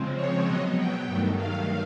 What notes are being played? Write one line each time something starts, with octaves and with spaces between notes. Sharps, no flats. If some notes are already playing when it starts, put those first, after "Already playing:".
Already playing: C#3 F3 G#3 C4
C#5
B2 F#3 B3 D#5
G5
G2 D#3 F#3 A3
F5